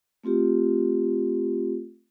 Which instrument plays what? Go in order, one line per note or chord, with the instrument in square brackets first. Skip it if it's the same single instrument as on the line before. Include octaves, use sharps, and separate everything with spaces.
[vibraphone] A3 C4 F4 G4